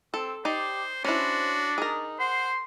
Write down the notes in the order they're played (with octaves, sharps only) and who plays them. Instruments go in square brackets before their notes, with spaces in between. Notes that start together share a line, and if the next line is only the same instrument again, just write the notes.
[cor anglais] C4 [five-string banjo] A4
[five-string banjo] D#4 D5 [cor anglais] G4 [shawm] C5
[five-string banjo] C#4 E4 [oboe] D4 [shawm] F#4 [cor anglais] C5
[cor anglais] D#4 [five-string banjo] G#4 A#4
[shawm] C5 [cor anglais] F#5 [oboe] C6